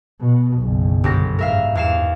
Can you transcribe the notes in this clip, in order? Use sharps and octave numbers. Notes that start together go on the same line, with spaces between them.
B2
F#1 B1
G1 G4 A#6
G#2 A#4 E5 F5
E2 F5 E7